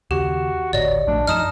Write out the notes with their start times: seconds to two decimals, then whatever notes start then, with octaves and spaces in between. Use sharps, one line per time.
0.11 D#2 C#3 F#4 G4
0.73 D1 G#1 D2 F#3 D5 D#5
1.07 A#1 F3 A3 D4
1.27 F#2 D#3 F3 D#4 A5 D#6 F6